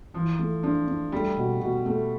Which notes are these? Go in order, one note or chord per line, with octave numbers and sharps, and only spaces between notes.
E3 F3
A3
F3 D4
D4
G3 A3
B2
B2
A3